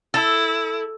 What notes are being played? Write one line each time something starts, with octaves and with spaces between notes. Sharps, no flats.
E4 A4